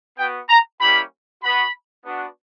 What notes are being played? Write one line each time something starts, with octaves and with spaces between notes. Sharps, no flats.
B3 F#4 G5
A#5
G3 A#3 C#4 E4 G4 B5
B3 F#4 B5
B3 D4 F#4